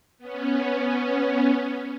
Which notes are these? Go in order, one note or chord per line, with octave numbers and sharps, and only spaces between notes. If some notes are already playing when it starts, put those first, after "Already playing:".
B3 C#4